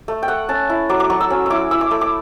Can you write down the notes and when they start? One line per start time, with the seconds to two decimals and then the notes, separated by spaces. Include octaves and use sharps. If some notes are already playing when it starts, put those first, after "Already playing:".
0.08 A3
0.23 G5
0.28 A3 F#5
0.49 C#4 A5
0.70 E4
0.89 F#3 D6
1.00 D6
1.10 F#3 C#6
1.21 E6
1.30 C#4
1.46 E4 D6 E6
1.71 E4 E6
1.81 D6
1.91 A3
2.01 D6